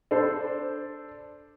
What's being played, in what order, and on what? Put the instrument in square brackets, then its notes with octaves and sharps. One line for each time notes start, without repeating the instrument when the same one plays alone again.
[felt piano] D4 A4 C5